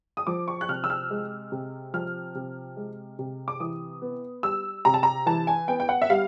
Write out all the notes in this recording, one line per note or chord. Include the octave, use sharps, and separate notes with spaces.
D#6
F3 D6
C#6
F#6
C3 F6
E6
F6
G#3
C3
F3 F6
C3
G#3
C3
D6
E3 D#6
B3
G3 E6
C3 A#5
A5
A#5
E3 A5
G#5
B3 G5
G5
F#5
E5
G3 F5